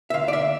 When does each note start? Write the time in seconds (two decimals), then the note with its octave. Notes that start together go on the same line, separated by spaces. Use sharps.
0.10 E5
0.14 D2 F5
0.28 D5
0.33 E5